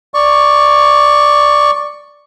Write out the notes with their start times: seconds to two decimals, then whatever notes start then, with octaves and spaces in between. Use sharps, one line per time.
0.14 D5 C#6